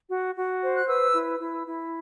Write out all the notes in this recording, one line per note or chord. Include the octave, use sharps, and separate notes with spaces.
F#4
F#4
C5
F#6
B4 E6
E4
E4
E4